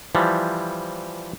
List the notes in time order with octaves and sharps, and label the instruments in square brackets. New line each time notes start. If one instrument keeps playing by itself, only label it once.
[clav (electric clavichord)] E3 F3 G3